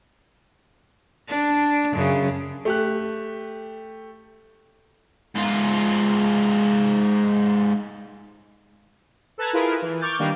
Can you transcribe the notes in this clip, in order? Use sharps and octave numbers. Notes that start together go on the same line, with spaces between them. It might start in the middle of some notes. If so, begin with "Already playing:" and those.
D4
F#2 C#3
A3 G4 F#6
G#2 F4
A4 B4 A5 A#5 F#6 G#6
E4 F4 G#4 A#4 B4 F5
E3
C#6 D6 F6 G6 A6
D#3 G3 A#3 D4